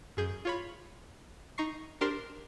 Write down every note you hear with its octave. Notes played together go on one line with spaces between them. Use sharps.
F#2 G#4 G6
F4 C#5 B5
D#4 A#5 C#6 C7
D4 G4 A#4 C5 C6